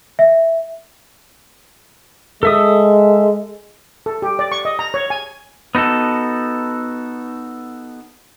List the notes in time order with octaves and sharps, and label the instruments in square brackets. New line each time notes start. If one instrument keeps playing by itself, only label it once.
[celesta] E5
[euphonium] G#3 [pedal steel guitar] A4 E5 D#6
[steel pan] A4
G4
D5
C#6
D#5
A#5
C#5
G#5
[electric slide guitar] B3 D#4 F#4 A4